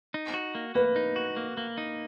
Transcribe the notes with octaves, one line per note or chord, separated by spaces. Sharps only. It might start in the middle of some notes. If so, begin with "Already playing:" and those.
D#4
F#4
A#3
A#3 B4
D#4
F#4
A#3
A#3
D#4